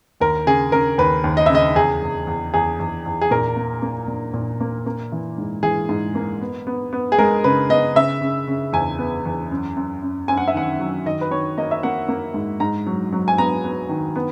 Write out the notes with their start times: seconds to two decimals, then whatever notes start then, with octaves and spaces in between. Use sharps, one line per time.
0.20 D#2 A#4
0.46 C#3 G#4
0.72 C#3 A#4
0.98 D#2 B4
1.24 D#2
1.37 D#5
1.46 E5
1.50 C#3 D#5
1.75 E2 G#4
2.02 E2
2.27 E2
2.54 E2 G#4
2.80 E2
3.06 E2
3.21 G#4
3.31 A#2 A#4
3.56 A#3
3.82 A#3
4.08 A#2
4.34 A#2
4.61 A#3
4.86 A#3
5.12 E3
5.38 G#2
5.63 E3 G#4
5.89 G#2
6.15 A#3
6.41 B3
6.67 B3
6.93 B3
7.12 G#4
7.18 G#3 A#4
7.44 C#3 B4
7.69 B3 D#5
7.95 C#3 E5
8.21 C#3
8.47 C#3
8.73 E2 G#5
8.99 B3
9.26 E2
9.51 F#2
9.76 F#2
10.02 F#2
10.28 F#2 G#5
10.37 F#5
10.48 E5
10.54 D#3 F#5
10.80 F#3
11.06 D#3 D#5
11.21 B4
11.31 D#3 C#5
11.57 A#3 D#5
11.71 E5
11.83 A#3 F#5
12.08 A#3
12.34 G#2
12.60 G#2 A#5
12.87 F#3
13.12 F#3
13.28 G#5
13.38 B3 A#5
13.64 B3
13.89 D#3
14.16 B3